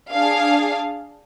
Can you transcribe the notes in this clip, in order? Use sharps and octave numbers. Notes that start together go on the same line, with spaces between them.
D4 G#4 F5